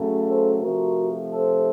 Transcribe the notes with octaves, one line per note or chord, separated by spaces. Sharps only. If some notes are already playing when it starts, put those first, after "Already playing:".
Already playing: C#3 F#3 A3
A4 C5
C3 F3 A3 F#4 A#4
A4 C5